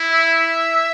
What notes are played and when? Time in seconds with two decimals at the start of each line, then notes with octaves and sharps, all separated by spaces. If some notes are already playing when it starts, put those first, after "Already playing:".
Already playing: E4
0.11 E5